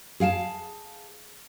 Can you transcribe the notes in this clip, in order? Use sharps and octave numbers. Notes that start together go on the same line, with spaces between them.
G#4 F5 G5 A5